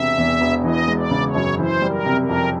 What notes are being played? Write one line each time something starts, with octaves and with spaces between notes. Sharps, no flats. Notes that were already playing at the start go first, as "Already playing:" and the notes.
Already playing: E1 C3 E5
E2
E1
E3 D#5
G#3
D5
C#3
C#5
F#2
E3 C5
G3
A#4
C3
A#4
F2